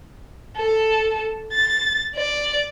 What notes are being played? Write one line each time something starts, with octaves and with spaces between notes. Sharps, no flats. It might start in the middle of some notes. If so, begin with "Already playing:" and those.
A4
A6
D5